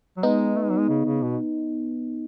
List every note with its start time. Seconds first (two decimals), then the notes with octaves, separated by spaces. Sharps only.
0.17 F#3
0.23 G#3 B3 D#4
0.56 A3
0.63 G#3
0.70 F#3
0.78 G#3
0.89 C#3
1.05 C#3
1.22 B2